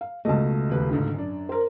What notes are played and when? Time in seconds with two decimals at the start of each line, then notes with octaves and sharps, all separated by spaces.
0.01 F5
0.25 C#2 B2 A3 D#5 A5
0.70 D#1 B4
0.90 G#2 D3 D#3
1.14 F#2 D4
1.49 A#4 C5